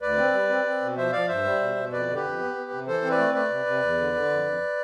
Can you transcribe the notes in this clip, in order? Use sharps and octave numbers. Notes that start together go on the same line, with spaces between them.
D2 B4 D5
C4
G3
C4
C4
B2
F3 C5 E5
F3 D5 F5
G2 C5 E5
G3
B2
B2
F2 B4 D5
D3
G4 B4
F2
B3
B3
C3
E3 A4 C5
C4
B4 D5
A3
A3 B4 D5
C3
C3
E2
D3
D3
F2
F2